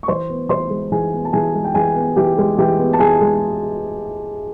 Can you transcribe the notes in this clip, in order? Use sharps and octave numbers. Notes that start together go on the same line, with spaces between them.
C#6
E3 C5 C6
B3
E3 C5 C6
G#3
E3 G#4 G#5
B3
A5
E3 G#4 G#5
G#3
G5
E3 G#4 G#5
B3
E3 G4 G5
G#3
E3 G4 G5
B3
A5
E3 G#4 G#5
G#3